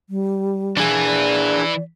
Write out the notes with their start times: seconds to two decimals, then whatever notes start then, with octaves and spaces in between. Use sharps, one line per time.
0.10 G3
0.77 E3 D4 G#4
1.05 D5